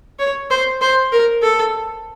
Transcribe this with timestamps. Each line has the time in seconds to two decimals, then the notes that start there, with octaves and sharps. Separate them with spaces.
0.19 C#5
0.51 C5
0.82 C5
1.12 A#4
1.43 A4